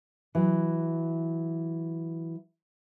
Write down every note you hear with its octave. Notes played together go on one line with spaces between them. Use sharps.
E3 F#3